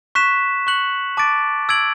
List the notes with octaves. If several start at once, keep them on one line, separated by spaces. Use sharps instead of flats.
C#6 F#6 B6 E7
C#6 F#6 C#7 F#7
A5 D6 A6 D7
E6 G#6 D7 F#7